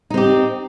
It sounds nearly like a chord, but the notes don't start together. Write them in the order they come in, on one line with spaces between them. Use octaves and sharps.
D#4 C4 G4